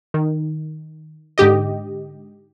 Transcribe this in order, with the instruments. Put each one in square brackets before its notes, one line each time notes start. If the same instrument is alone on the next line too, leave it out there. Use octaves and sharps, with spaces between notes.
[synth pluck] D#3
G#2 D3 G4 D#5